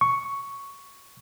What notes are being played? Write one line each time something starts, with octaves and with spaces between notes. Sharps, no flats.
C#6